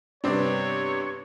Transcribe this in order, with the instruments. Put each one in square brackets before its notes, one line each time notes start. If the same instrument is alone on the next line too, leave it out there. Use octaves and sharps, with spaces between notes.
[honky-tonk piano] G2 C3 [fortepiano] B3 C4 D4 [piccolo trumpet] C#5